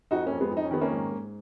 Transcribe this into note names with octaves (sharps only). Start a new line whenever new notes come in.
F2 D#4 F#4
A#3 C#4
F2
G#3 B3
F2
D#4
C#4
D#3 B3
A#3 C#4
G#2
G#2